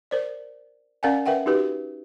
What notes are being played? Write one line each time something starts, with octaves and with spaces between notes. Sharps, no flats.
A#4 C5 D5
C#4 A#4 D5 F5 F#5 G#5
A#4 B4 E5 F#5 G5
D#4 F#4 G4 B4